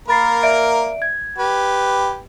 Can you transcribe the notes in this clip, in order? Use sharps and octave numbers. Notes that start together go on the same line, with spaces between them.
A#3 A#4 B5 A6 C7
D5 E5 D7
G#6
G4 B4